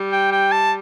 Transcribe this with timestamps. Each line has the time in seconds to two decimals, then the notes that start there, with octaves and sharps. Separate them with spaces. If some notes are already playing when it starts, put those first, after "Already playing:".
Already playing: G3
0.12 G5
0.32 G5
0.52 A5